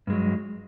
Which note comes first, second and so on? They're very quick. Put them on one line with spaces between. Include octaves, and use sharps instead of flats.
G2 G#3 F#3